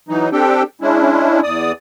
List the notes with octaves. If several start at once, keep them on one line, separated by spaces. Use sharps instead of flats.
E3 F#3 D#4
C4 D4 G4 A4 G5
G#3 C#4 D4 E4
E2 D5 D#6